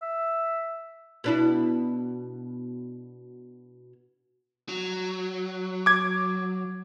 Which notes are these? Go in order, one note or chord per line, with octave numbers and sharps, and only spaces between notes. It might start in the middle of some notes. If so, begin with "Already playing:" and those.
E5
B2 D4 E4
F#3
D6 G#6